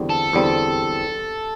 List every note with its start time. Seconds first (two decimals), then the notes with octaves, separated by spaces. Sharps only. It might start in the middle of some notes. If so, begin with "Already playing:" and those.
Already playing: E2 D3 G3 C4
0.10 A4
0.33 E2 D3 G3 C4